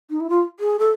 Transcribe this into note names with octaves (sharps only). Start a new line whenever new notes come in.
D#4
E4
F4
G#4
A4